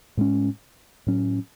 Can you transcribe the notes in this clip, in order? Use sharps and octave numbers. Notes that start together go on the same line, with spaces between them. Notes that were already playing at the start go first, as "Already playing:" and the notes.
A2 G#3 C#4
A2 F#3 C#4